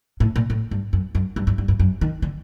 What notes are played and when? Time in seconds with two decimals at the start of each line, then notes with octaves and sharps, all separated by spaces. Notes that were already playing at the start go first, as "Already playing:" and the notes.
0.20 A2
0.36 A#2
0.50 A2
0.71 G2
0.93 F#2
1.15 F#2
1.36 G2
1.47 G2
1.58 G2
1.68 G2
1.80 F#2
2.01 D#3
2.22 D3